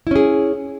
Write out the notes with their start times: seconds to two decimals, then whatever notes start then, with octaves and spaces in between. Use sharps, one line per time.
0.07 E4
0.11 C#4
0.16 G#4